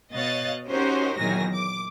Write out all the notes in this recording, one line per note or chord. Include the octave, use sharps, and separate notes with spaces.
B2 C#5 D#5 F5 F#6 A6
C#4 D#4 F#4 G4 A#4 C5
E2 A#2 D#3 F#3 G#5 A#6
D6